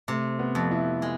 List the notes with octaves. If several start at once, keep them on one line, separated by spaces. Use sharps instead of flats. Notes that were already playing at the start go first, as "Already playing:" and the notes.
C3 A3
B3
F2
E4
G#3